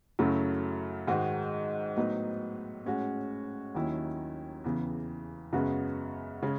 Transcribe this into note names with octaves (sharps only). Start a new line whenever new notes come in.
F#2 C#3 F#3 A3 E4
G#2 D#3 G#3 D#4 F#4
A2 F#3 B3 D#4
A2 G#3 C#4 F#4
D#2 D#3 F#3 C#4 E4
E2 C#3 E3
F#2 C#3 G#3 B3 F#4
C#3 G#3 C#4